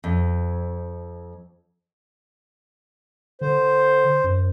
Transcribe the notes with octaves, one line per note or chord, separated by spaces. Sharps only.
F2
D3 C5
F#2